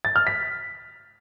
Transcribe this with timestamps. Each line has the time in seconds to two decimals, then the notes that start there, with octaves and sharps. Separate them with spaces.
0.05 A6
0.16 F6
0.27 B6